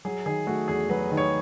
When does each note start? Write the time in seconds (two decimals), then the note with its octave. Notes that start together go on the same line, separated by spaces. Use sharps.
0.05 F#3 G#4
0.26 D#3 G#4
0.47 A3 F#4
0.68 E2 G#4
0.90 F#3 B4
1.11 D#3
1.17 C#5